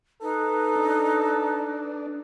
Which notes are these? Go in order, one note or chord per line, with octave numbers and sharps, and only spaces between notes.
D#4 A4 B4
D4